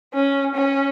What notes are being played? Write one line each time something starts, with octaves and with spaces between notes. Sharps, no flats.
C#4
C#4